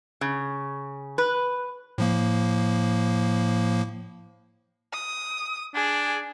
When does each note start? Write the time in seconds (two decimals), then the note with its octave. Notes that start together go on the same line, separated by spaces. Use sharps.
0.21 C#3
1.18 B4
1.98 A2 F3 A#3
4.92 D#6
5.75 D4 G#4